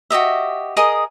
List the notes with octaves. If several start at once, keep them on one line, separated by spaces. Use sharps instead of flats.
F#4 G4 D#5 E5
G#4 A#4 D#5 D#6